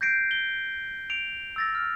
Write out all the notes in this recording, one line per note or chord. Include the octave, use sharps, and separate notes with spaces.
G6 G#6 A#6 C7 D7
G7
D7 F7
E6 A6 A#6
F6